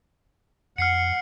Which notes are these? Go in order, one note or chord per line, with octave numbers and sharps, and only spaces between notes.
F2 F#5 F6 C7 C#7